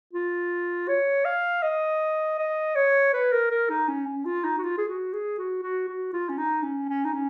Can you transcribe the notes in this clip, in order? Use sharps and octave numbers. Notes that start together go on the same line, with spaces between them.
F4
C#5
F5
D#5
D#5
C#5
B4
A#4
A#4
D#4
C#4
C#4
F4
D#4
F#4
F4
G#4
F#4
G#4
F#4
F#4
F#4
F4
C#4
D#4
C#4
C#4
D#4
C#4